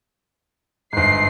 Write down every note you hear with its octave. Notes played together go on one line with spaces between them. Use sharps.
G1 G#2 C7